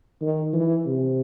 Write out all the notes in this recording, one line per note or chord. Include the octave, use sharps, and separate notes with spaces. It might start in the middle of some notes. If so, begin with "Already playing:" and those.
D#3
E3
C3